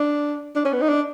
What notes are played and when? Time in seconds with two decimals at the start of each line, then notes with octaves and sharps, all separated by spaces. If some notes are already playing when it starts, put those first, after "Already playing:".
Already playing: D4
0.56 D4
0.65 C#4
0.73 B3
0.81 D#4
0.89 D4